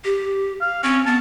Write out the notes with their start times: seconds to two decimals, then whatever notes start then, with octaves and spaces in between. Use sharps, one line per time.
0.04 G4
0.61 F5
0.84 C4 C#4
1.06 B3 A5